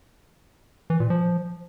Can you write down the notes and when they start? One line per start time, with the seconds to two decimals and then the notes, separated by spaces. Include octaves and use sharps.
0.90 E3
1.00 A#2
1.10 F3